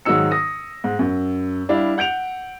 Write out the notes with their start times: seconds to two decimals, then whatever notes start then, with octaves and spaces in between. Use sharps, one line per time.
0.05 G#2 D#3 F#3 D#4 E6 C#7
0.31 D#6 A#6
0.84 G#2
0.99 F#2
1.69 G3 D4 E4 F5
1.98 F#5 G6 D7 F7